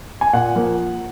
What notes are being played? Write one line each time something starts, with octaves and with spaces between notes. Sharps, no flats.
G#5
A#2 F#5
F3 A#3